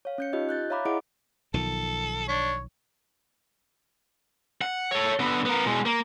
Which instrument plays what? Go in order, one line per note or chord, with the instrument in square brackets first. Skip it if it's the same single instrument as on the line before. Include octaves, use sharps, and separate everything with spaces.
[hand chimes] C#5 F5
C#4 G6 C#7
D#4 F4 G4 D#5
F#6 G6 A6
C#5 E5 F5 A#5 B5 D6
E4 G#4 D#5 F#5 D6 D7
[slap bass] B1 D#3 F3 [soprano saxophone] A4
[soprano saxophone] D4 [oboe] C#5
[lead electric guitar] F#5
A4 C#5
D3 B3
B3 A#4
B2 G#3
A#3